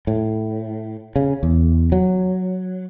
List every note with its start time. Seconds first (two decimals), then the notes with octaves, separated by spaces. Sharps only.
0.07 A2
1.16 C#3
1.43 E2
1.92 F#3